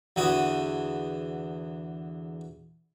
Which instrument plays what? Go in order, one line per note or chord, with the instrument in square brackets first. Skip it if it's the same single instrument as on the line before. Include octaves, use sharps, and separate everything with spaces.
[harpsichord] E2 D3 F#4 D#6